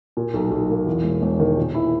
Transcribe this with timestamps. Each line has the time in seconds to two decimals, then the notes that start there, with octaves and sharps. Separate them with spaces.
0.17 A#2
0.34 B1
0.51 B1
0.70 A#3
0.87 E2
1.04 E1
1.22 E1
1.40 D#3
1.57 A#2
1.75 E4